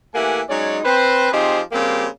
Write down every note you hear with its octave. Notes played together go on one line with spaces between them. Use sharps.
E3 A3 A#3 G4 F#5 G#5
F#3 G#3 C#4 D#4 C#5 D5
C4 B4 C5
F3 C4 D#4 G4 G#4 C5
C#3 G3 A#3 C4 F4 G4